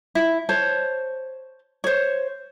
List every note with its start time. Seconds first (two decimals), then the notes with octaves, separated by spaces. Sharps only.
0.15 E4
0.49 C5 C#5 A5
1.84 C5 C#5